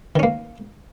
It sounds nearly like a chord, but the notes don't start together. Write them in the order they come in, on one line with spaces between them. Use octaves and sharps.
D#3 C#4 A#3